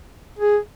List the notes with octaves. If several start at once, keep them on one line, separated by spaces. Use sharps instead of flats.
G#4